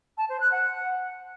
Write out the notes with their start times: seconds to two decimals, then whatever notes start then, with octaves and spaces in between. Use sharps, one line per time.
0.17 A5
0.28 C5
0.40 F#6
0.51 F#5